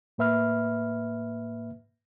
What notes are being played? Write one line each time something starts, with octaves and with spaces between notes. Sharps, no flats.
A2 A#3 B4 E5 B5 F6